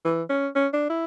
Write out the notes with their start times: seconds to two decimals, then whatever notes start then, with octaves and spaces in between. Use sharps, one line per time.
0.04 E3
0.29 C#4
0.55 C#4
0.73 D4
0.90 E4